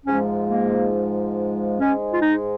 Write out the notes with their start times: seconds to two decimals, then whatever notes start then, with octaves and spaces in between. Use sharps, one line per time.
0.06 G#2 F3 G#3 C#4
0.49 A#3
1.79 G#2 G#3 C#4
2.13 F4
2.22 D#4